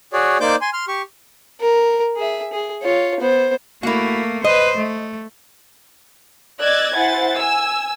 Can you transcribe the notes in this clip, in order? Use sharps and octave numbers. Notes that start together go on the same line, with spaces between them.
F#4 G#4 C#5 D5
A#3 D#4 C5 D5 D6 G6
G#5 C6
C6 F6
G4 C#6
A#4
G#4 E5
G#4
F4 C#5
B3 C5
A3 A#3 E4 F#4
B4 C5 D#5
A3
D5 D#5 E6 F#6 G#6 A6
E4 C5 F#5 G#5 A6
G#5 E6